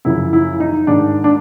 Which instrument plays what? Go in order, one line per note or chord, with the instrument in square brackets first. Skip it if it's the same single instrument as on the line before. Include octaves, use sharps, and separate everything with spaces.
[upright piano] F#2 C#3 F3 E4
E4
D#4
G#2 D#3 G#3 D4
D4